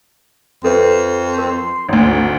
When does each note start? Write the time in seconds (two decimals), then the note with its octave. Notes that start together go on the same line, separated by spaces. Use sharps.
0.64 F2 A4 B4 E5 C6
1.39 A#4 C6
1.89 G#1 D2 D#4